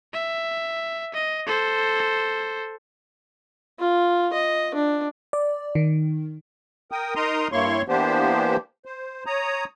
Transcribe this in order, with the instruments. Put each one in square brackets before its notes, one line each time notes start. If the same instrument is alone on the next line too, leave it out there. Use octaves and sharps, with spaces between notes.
[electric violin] E5
D#5
A4 C5
[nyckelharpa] F4
D#5
D4
[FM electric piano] D5
D#3
[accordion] A#4 G5 D#6
D#4 A#4 A#5 C6 D#6
G2 A#3 E4 C#5 C6 C#6
E3 A#3 B3 D4 G4 C5
C5
C#5 A#5 D#6